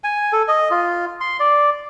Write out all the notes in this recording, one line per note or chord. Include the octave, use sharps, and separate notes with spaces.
G#5
A4
D#5
F4
C6
D5